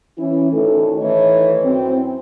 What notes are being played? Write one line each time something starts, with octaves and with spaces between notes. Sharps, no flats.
E3 C#4 E4
D2 A2 D#3 A4
D#3 E3 A3 D#4 C#5
F#2 C4 E4